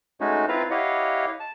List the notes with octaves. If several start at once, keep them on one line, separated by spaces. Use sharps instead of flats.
G#3 A3 C#4 D#4 F#4
C4 E4 F4 B4 F5 A#5
E4 G4 C#5 D#5 F5 F#5
A5